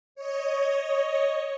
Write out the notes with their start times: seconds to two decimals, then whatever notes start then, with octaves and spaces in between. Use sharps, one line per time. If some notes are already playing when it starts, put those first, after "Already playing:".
0.15 C#5 D#5